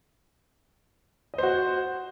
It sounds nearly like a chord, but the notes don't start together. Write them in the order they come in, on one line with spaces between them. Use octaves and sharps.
D#5 C5 F#4